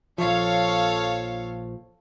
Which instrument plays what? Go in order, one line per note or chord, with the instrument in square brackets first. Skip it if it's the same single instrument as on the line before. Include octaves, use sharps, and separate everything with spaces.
[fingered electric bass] A#1 F3 [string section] A4 C#5 F5